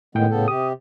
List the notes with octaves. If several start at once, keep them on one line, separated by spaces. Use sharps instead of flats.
A2 D#3 G#3 B3 G5
C#3 B3 A4
C3 G4 D#6